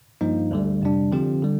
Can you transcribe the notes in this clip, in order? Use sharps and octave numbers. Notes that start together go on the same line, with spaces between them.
G2 F3 A#3 D#4
D2 D3 G3
F2 C3 G3 D4
D3 F3 C4 G4
D3 G3